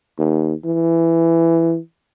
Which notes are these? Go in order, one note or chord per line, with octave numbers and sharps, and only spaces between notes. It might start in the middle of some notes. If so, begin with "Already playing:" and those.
D#2
E3